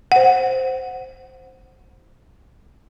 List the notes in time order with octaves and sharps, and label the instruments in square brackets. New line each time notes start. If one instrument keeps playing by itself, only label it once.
[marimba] C5 F#5